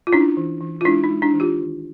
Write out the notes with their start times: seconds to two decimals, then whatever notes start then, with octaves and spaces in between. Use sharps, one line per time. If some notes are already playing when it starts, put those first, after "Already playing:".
0.07 F4
0.13 C#4 D4 E4
0.37 E3
0.61 E3
0.81 F4
0.85 G#3 D4 E4
1.04 D#4
1.10 G#3
1.22 D4 E4
1.34 E3
1.40 F4 G4
1.59 D#3